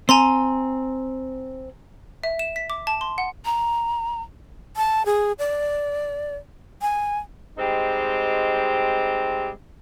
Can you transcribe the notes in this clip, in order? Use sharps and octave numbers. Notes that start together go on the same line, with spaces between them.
C4 G#5 A#5 C6
E5
E7
B6
D6
A5
C6
F#5
A#5
A5
G#4
D5
G#5
G3 G#3 C4 D#4 G4